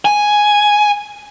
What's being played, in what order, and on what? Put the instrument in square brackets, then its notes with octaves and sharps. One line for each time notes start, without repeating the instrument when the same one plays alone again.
[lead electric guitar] G#5